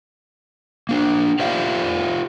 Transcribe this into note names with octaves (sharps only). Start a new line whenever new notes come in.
A#3 D4
F4 G4 C5 D5 E5 F5